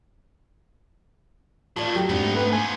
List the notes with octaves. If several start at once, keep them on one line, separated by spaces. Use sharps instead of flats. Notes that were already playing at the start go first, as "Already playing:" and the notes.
A2 D#3 F4 D5 A5
F#3 G4 A4
F2 G#2 B3 C4 D4 D#4
A3
B4
F3 B3 G#5